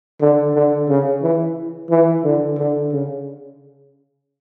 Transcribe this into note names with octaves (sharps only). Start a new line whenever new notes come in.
D3
D3
C#3
E3
E3
D3
D3
C#3